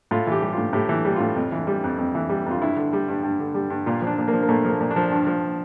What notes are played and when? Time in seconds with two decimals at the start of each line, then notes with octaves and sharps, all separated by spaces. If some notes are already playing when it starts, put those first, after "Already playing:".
0.11 A2 F4
0.27 E3 G4
0.42 G3
0.53 F4
0.58 A2
0.73 A2 G4
0.89 E3 E4
1.05 G3
1.16 A2 F4
1.36 F2
1.52 E3
1.67 G3
1.83 F2
1.98 F2
2.15 E3
2.29 G3
2.46 F2 F4
2.61 G2 E4
2.77 D3
2.93 G3
3.08 G2
3.23 G2
3.40 D3
3.54 G3
3.70 G2
3.86 A#2 F4
4.02 F3 D4
4.18 A#2
4.28 A#3
4.33 F3
4.43 A#3
4.49 A#2 A3
4.65 F3 A#3
4.81 A#2
4.91 D4
4.96 F3
5.11 G2
5.27 F3